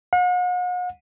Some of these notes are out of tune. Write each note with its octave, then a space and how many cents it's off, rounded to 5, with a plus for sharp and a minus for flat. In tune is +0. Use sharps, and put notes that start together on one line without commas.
F#5 -45